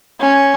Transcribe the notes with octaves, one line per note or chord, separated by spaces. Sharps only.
C#4